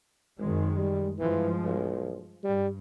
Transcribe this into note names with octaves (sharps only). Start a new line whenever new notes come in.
G#1 F#2 D#3 G#3
G3
G2 E3 F3 G#3
B1
G2 G3